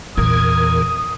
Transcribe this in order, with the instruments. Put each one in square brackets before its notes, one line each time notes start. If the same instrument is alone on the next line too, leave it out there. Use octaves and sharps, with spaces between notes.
[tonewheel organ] E2 A#4 G#6 [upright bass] A#2 E3 [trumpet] D#6